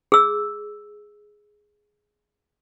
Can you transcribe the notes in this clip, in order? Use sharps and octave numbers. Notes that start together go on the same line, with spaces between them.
G#4 E6